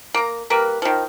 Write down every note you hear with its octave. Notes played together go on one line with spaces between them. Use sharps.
A#3 A#5
G3 A#3 A#4 B4
D#3 F3